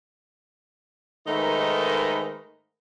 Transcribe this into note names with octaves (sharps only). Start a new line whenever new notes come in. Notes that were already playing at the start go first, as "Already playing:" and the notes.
G#2 D#3 A3 D#4 A#4 B4